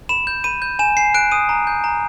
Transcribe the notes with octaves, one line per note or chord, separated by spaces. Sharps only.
B5 E7
G6
B5 D#7
G6
G#5 E7
G#5 C7
F#6 D7
D#6 D#7
A#5
G6
A#5